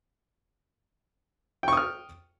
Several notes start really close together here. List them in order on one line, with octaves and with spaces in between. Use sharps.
G5 C#6 D#6 F6